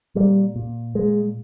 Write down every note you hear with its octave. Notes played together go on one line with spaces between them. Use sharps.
A#2 G3
A#2
A#2 G#3